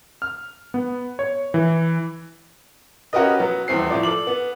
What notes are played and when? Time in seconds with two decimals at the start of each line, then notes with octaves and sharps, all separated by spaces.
0.22 F6
0.74 B3
1.19 C#5
1.54 E3
3.13 C#4 F#4 G4 A#4 B4 D#5
3.39 F#3 B3
3.68 D#1 E2 C4 C7
3.90 A2 F3 D5
4.03 A4 D6 F#7
4.27 B3